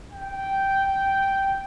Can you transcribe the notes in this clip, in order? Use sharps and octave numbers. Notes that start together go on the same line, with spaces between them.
G5